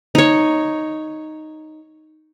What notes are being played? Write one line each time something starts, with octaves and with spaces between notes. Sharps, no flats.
D#4 C#5